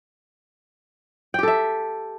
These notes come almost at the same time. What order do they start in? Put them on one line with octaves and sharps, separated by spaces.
G5 G4 A4 E5